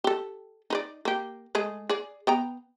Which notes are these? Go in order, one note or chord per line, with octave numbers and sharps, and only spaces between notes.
G4 A4
D#4 B4 D5
A#3 G4
G#3 A3 G#4
G#4 D5
B3 G5 A#5